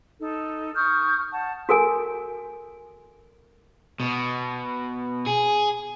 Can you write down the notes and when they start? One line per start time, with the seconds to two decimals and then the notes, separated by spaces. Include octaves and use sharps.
0.19 D#4 A4
0.75 C#6 D#6 F6 G6
1.32 F#5 A5
1.69 F#4 A4 A#4 G#5
4.00 B2
5.26 G#4